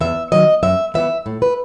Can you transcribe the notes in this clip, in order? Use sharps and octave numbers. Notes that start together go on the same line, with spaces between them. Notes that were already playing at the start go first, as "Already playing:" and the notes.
E2 E5
D#3 F#3 D#5
F#2 E5
E3 B3 E5
A2
B4